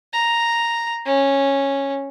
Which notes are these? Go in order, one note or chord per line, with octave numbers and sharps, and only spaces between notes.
A#5
C#4